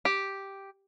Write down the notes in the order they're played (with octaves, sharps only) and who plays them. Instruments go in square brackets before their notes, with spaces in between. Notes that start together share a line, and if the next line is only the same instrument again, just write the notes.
[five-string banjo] G4